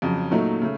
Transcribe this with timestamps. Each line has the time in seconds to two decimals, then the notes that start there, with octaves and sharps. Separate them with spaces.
0.02 F2 C#3 F#3
0.31 A#2 F#3 A3 D#4
0.62 C#3 A3